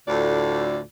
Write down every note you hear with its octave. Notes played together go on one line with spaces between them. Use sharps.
D2 A2 D3 F4 D5